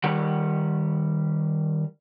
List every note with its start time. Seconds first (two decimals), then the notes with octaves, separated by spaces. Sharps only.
0.04 D#3 G3 F#5